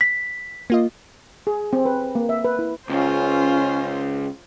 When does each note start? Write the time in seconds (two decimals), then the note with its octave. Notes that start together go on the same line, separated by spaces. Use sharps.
0.01 B6
0.70 A#3 F4 D#5
1.47 G#4
1.73 C4
1.85 B4
2.15 A#3
2.29 E5
2.45 B4
2.59 E4
2.89 C#2 C#4 F4 C5